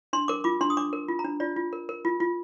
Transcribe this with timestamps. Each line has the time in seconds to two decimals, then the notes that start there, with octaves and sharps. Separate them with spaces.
0.13 D4 C6
0.28 A#4 D6
0.44 F4 D6
0.61 D4 C6
0.70 D#6
0.77 D4 D6
0.93 A#4
1.08 F4
1.19 A#5
1.25 D4
1.40 F4 D5
1.56 F4
1.73 A#4
1.89 A#4
2.05 F4
2.20 F4